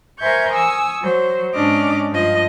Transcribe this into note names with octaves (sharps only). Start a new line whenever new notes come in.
A#4 C5 E5 G#5 C#6 G6
G#5 C#6 D#6 E6
F#3 C5
G#2 C#4 D4 D#5 D6 F6
G2 F3 D#5